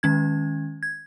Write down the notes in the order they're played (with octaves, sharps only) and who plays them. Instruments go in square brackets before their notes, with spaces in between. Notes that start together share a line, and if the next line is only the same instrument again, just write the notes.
[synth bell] D#3 G#3 C#4 G#6
G#6